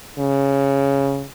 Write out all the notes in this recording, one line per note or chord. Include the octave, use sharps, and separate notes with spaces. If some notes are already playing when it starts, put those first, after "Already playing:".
C#3